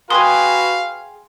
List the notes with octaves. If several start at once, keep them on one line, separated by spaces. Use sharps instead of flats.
F#4 G#4 B4 F5 G5 G#5 C6 D#6